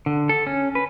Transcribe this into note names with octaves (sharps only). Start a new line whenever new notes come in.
D3
A4
C#4
B4